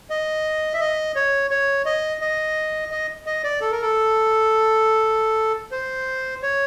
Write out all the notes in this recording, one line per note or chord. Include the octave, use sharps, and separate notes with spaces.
D#5
E5
D#5
C#5
C#5
D#5
D#5
D#5
D#5
D5
A4
A#4
A4
C5
C#5